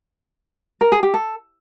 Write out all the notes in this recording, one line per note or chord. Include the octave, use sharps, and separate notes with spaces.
A#4
G#4
G4
A4